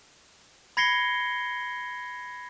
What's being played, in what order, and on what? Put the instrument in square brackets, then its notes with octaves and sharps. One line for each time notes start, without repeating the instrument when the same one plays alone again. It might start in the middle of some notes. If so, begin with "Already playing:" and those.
[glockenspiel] B5 G#6 A#6 C7 C#7 G7